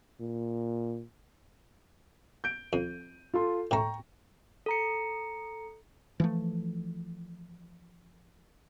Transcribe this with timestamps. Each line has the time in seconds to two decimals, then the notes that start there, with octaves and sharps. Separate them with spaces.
0.21 A#2
2.44 G6 D7
2.73 F2 D#7
3.34 F4 A4 C6
3.71 A2 A3 G5 A#5 C#6
4.66 A4 A#5 C#7
6.20 E3 F3 A3